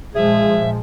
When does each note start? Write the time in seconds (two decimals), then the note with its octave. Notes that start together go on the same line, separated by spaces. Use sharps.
0.15 A#2 F3 G#3 G#4 E5